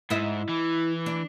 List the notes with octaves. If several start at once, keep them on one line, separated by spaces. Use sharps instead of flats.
G#2 E4 D#5 E5
E3
D4